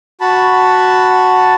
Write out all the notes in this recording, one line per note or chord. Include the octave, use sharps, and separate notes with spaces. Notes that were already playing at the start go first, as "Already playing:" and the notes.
F#4 A5 B5